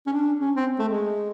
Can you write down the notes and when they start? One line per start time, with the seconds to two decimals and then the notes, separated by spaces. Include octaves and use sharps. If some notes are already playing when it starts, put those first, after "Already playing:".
0.06 C#4
0.13 D4
0.41 C#4
0.56 C4
0.79 A3
0.89 G#3